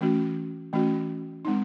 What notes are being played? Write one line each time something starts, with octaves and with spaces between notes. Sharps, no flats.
E3 A3 C#4 F#4
E3 A3 C#4 F#4
G#3 C4 D#4